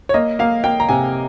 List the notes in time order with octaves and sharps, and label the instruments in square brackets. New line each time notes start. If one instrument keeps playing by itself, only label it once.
[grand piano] C#5
A#3 D#5
A#3 F5
A#3 G5
A#5
C3 G#5